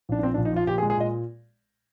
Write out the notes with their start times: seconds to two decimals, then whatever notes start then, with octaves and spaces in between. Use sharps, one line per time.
0.09 A#1 D4
0.19 D4
0.23 A#2 C4
0.34 D4
0.37 A#1
0.45 D#4
0.53 F3 F4
0.67 A#2 G4
0.78 G#4
0.82 G#3
0.90 G#4
0.97 A#2 D#5